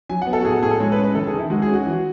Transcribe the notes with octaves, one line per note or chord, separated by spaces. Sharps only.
F#3 G#5
F#5
B3
A4
F#4
A2 G#4
A4
A2 G#4
A4
G#3 C#5
B4
C#4
B4
D#3 A4
G#4
D#3
E4
G#3 F#4
G#4
C#4
F#4
E3